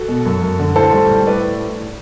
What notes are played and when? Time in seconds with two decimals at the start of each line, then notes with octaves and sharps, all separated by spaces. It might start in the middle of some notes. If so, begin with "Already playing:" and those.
Already playing: F#4 A4
0.08 B2
0.25 F#2
0.42 F#2
0.59 D3
0.76 A2 A4 C5
0.93 G3
1.10 A2
1.26 A2 B4 D5